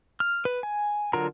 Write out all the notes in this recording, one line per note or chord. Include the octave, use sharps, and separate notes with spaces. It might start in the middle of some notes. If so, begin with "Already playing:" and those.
F6
B4
G#5
D3 F#3 F4 A#4 A#5